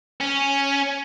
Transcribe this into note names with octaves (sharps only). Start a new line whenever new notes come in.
C#4